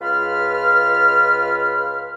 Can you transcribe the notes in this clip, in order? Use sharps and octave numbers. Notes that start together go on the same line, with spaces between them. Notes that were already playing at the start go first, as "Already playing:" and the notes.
C#2 F4 B4 B5 F6